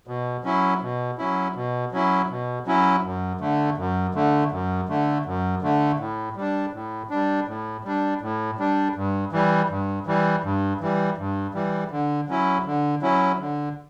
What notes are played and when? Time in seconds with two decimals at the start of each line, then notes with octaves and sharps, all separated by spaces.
0.07 B2
0.44 F#3 C#4 E4
0.82 B2
1.18 F#3 C#4 E4
1.55 B2
1.92 F#3 C#4 E4
2.30 B2
2.66 F#3 C#4 E4
3.03 F#2
3.41 D3 A3
3.77 F#2
4.15 D3 A3
4.51 F#2
4.89 D3 A3
5.26 F#2
5.62 D3 A3
6.00 A2
6.36 G3 D4
6.73 A2
7.10 G3 D4
7.48 A2
7.84 G3 D4
8.21 A2
8.59 G3 D4
8.95 G2
9.32 E3 G3
9.70 G2
10.07 E3 G3
10.44 G2
10.81 E3 G3
11.18 G2
11.54 E3 G3
11.91 D3
12.29 F#3 C#4 E4
12.66 D3
13.02 F#3 C#4 E4
13.39 D3